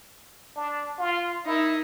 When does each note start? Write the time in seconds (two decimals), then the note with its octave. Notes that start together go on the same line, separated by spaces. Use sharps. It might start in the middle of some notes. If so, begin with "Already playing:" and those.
0.56 D4
0.99 F4
1.46 D#4 E4 A#4